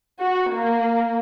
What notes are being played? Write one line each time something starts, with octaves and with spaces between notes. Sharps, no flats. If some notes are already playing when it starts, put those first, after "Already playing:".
F#4
A#3